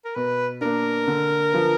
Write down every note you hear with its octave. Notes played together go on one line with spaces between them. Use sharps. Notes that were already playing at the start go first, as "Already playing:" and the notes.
A#4
B2 B4
A#3 D4 A#4
D3
F3 B3